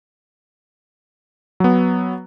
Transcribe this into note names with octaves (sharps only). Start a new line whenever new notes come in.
F#3 B3